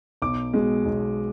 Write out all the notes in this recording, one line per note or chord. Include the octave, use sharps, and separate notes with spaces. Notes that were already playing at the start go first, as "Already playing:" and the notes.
B1 D6
B2 G#3
B1